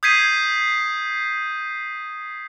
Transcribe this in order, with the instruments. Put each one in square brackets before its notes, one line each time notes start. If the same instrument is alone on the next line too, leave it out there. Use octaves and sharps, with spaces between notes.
[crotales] D#6 G6 G#6 B6 C7 D#7